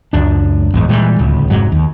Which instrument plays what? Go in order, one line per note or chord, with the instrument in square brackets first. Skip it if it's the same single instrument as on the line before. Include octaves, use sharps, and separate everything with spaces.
[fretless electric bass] C#2 F#2 D4
A1 E2 G#2
A#2 E3 G3 G#3
D1 C#2
F1 G#2 F#3
D#2